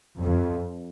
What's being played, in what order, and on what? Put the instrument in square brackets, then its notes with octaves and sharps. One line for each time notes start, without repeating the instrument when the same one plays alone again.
[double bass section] F2